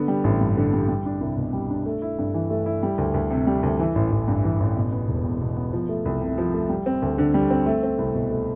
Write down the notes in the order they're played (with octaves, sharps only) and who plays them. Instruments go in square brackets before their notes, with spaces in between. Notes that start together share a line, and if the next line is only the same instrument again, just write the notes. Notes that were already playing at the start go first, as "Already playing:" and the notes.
Already playing: [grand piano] D3 B3
G3
A1
G2
D3
G3
G3
D4
C2
B2
G3
D4
A3
E4
G2
E3
A3
E4
G3
D2
D2
C3
G3
D2
E3
A1
A1
G2
E3
A1
B2
B3
E1
E2
B2
B3
F3
A3
C2
C3
F3
A3
G3
C4
D2
D3
G3
C4
A3
C4
C2
B2
A3